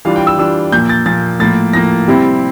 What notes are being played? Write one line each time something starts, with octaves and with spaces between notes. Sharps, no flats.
E3 G3 D4 F4 F5
G5
E6
E3 G3 D4 F4 E6
A#2 F3 A#3 G6
A6
A#2 F3 A#3 A6
A2 F3 A#3 A6
A2 F3 A#3 A#6
C3 G3 C4 E4